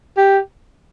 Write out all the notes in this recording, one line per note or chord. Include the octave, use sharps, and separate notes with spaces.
G4